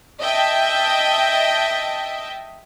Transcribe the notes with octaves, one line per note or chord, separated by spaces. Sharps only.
D#5 E5 G5 A5